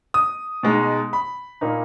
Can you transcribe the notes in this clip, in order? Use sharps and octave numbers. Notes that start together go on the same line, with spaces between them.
D#6
B2 G#3 D#4
B5
A#2 A#3 D#4